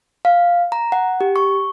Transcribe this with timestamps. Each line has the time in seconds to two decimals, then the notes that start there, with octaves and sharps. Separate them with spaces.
0.25 F5
0.72 A#5
0.92 F#5
1.21 G4
1.36 C#6